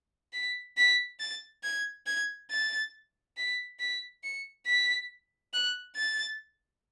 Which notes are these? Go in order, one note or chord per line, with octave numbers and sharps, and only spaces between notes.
B6
B6
A6
G#6
G#6
A6
B6
B6
C#7
B6
F#6
A6